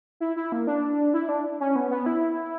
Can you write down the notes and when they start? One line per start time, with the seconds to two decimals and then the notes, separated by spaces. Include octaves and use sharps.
0.20 E4
0.36 E4
0.52 A#3
0.67 D4
1.14 E4
1.29 D4
1.60 C#4
1.76 B3
1.91 B3
2.06 E4